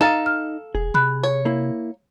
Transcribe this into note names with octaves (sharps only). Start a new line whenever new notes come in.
D#4 A4 D#5 F5 A#5 A6
F6
E1 G#4
C3 B5 F#6
C#5
A#3 E4